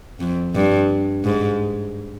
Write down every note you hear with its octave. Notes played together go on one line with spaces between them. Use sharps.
F2
G2
G#2